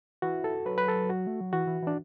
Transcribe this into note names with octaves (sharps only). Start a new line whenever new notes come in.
E3 F#4
A4
F#3 B4
B4
A4
F#4
A3
F#3
E3 F#4
E3
E3 D4